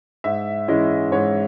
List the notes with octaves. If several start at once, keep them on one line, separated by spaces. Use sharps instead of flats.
G#2 E5
E3 G#3 C#4 E4 D#5
G#2 C#5